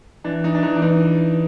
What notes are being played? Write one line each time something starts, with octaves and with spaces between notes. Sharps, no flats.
E3 D4
E3 D#4
D4
E3 D#4
D4
E3 D#4